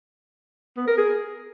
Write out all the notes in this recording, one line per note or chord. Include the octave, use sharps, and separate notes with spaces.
B3
A#4
G#4